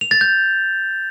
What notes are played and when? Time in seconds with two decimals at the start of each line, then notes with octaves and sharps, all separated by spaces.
0.01 F7
0.11 A6
0.21 G6